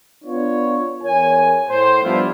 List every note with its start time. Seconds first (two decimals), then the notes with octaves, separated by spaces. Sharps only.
0.24 B3 D4 F4 C#5
1.02 E2 A#4 C#5 G#5
1.69 A2 C5
2.02 F3 G3 B3 D4 E4 F4